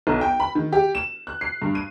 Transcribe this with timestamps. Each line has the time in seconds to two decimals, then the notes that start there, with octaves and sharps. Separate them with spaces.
0.07 B1
0.21 G5
0.40 B5
0.55 D#3
0.73 G4
0.95 E7
1.27 F#6
1.41 C7
1.62 G2
1.75 D#7